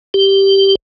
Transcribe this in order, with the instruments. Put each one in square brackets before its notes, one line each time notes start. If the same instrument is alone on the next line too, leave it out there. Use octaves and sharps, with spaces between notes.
[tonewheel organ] G4